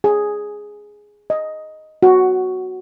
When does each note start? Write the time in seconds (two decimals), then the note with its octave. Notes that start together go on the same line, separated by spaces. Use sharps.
0.04 G#4
1.30 D#5
2.03 F#4